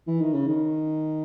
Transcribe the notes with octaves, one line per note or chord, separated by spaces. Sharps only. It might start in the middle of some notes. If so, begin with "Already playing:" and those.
E3
D#3
C#3
D#3